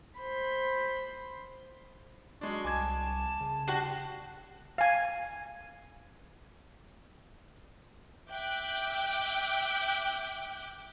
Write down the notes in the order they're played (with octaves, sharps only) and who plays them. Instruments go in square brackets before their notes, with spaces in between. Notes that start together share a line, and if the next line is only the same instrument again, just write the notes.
[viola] C5 B5
[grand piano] F#3 G#3 D4 [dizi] C#6
[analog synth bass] C2 [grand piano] G#5 D6 G#6 [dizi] A5
[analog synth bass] C#3
[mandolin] D4 F#4 [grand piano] G4
[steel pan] F5 G#5
[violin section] E5 G5 D6 F#6 G6